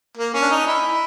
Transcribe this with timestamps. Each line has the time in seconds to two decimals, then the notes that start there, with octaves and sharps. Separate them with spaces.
0.17 A#3
0.34 C#4
0.42 D4
0.51 D#4
0.67 E4